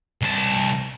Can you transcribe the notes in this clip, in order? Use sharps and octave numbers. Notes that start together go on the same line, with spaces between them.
C2 A5